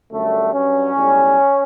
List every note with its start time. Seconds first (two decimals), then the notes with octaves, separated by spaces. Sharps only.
0.12 F#2 D3 G3 A3
0.54 G2 F#3 C#4
0.95 B1 A2 G3